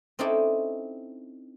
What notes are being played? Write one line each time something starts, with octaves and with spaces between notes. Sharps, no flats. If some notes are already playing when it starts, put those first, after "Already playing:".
C4 C#4 D#4 E4 A4 D5